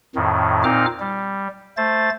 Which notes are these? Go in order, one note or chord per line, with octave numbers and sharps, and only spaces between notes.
F2 A2 D#3
A#2 C4 D#4 D6 F6
G3
A3 C5 A6